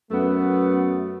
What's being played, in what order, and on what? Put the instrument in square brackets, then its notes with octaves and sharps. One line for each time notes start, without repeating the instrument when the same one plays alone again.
[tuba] F#2 [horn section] A3 B3